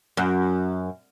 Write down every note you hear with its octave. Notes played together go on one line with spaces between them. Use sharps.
F#2